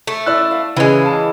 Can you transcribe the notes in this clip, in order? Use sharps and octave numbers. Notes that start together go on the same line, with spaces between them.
A3
E4 D5 E6 F#6
F5
C#3 E3 G#3 C#4 E4 B4
F5 A5